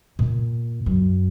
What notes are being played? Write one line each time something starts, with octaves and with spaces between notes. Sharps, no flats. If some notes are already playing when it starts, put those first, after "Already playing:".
A#2
F#2